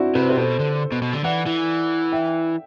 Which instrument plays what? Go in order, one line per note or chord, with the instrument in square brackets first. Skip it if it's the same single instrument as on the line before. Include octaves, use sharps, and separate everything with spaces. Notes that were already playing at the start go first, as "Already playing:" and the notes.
Already playing: [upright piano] C4 D4 E4 F#4
[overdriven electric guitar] C3 [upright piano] B4
[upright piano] C5
G4 B4
[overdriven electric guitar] B2 [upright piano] A4 C5
[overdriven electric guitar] D3
B2
B2
D3
[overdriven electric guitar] E3 [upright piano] D5 F#5
[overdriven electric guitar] E3
[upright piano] E5 G5